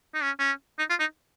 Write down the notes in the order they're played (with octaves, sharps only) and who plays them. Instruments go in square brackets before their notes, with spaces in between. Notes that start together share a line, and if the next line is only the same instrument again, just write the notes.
[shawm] D#4
C#4
C#4
D#4
F4
D#4